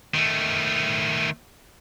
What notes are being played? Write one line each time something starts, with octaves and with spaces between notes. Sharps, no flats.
D#3 A3